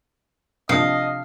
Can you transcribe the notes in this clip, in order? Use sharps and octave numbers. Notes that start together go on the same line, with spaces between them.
C3 F3 D4 D#5 F5